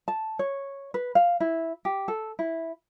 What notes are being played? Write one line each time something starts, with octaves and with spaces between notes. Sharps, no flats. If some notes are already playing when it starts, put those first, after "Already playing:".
A5
C#5
B4
F5
E4
G4
A4
E4